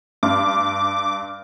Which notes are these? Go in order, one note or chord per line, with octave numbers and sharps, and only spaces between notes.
G2 D6